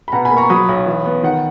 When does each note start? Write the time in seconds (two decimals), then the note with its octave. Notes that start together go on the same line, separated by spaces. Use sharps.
0.08 B5
0.12 B2 F#5 A#5
0.25 G#5 B5
0.31 A#3
0.37 A#5 C#6
0.49 F#3 B5 D#6
0.69 B1
0.86 E3
1.06 B3
1.23 D#3 F#5